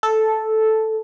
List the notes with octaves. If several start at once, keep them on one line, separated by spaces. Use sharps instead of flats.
A4